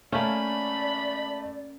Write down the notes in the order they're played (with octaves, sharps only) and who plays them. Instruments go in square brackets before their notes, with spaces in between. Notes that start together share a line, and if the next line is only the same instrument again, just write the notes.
[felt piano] A3 [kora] A#3 C#4 [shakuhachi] D5 [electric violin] B5